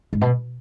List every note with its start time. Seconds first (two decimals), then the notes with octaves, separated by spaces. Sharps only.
0.13 G#2
0.21 B2